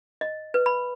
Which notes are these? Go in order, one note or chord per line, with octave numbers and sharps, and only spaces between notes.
D#5
B4
B5